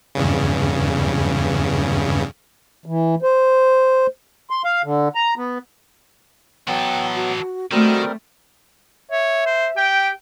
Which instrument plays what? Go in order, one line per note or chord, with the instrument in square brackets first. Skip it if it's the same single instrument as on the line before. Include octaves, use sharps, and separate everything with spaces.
[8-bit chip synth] E2 G2 C#3
[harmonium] E3
C5
[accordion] C6
F5
D3
A#5
B3
[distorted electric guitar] E3 A4 [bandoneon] F#3 B3 [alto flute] G5
[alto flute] F#4
[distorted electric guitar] D#3 [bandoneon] G3 C4 A#4 [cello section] A3 [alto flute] F#4
[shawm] C#5 [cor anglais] E5
[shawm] C5
[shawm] G4 [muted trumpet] G5